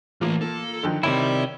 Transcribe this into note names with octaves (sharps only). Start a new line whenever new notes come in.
E3 A3 A#3 F4
A4
D3 D#3 F3
C3 D#3 E4 C#5 D5 G5